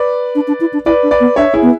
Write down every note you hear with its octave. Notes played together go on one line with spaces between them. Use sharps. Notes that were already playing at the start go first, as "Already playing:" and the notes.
Already playing: B4 D5
D4
D4
E4
D4
E4 B4 D5
D4
B4 D5
B3
D4 C#5 E5
E4 G#4
B3